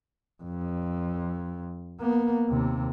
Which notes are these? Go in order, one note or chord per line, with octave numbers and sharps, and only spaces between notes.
F2
A#3 B3
D#2 C3